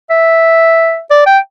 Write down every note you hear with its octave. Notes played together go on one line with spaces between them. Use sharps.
E5
D5
G5